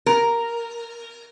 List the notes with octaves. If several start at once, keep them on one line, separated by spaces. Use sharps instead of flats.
A#4